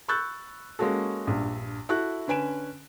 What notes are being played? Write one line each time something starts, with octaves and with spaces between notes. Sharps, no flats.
B5 C#6 E6 F#6 G6 A6
G#3 A#3 C#4 F#4 A4
A#1 G2
E4 F#4 A4 C#6 F#6
D3 C#4 B4 G#5 D7 E7